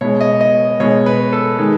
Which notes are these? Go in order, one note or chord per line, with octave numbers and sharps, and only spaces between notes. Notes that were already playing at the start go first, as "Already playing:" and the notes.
B2 G#3 C#5
D#5
D#5
B2 G#3 C#5
B4
A4
D#3 G#3